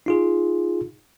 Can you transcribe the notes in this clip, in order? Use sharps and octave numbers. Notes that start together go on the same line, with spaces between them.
D#4 F4 G#4